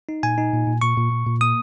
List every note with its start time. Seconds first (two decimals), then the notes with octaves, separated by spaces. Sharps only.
0.09 D#4
0.23 A#2 G#5
0.38 D#4
0.53 A#2
0.67 A#2
0.81 A#2 C#6
0.97 A#2
1.12 A#2
1.26 A#2
1.41 A#3 D#6